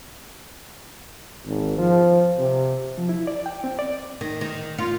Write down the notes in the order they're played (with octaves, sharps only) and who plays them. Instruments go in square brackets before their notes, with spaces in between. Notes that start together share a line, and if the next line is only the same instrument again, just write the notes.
[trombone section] G#1
F3
C3
[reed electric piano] F3
E4
D5
G5
C4
D5
[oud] D#3
D#3
F4